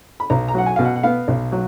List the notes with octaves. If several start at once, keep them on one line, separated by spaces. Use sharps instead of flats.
B5
B1 A#5
A#5
F#3 F#5
G#5
B2 F5
F#5
F#5
B3 F5
B1
F#3